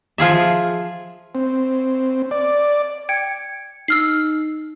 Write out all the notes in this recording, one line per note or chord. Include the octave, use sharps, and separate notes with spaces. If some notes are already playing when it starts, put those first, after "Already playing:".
F3 F4 G#4 E5
C4
D5
G5 G#6 C#7
D#4 E6 F6 C7